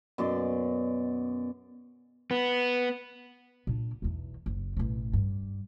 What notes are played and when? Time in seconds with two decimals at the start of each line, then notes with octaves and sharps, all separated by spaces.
0.18 F#2 B2 D5 C6
2.31 B3
3.67 A#2 D4
4.02 B1 E2
4.46 F#1
4.77 A1 B2
5.13 G2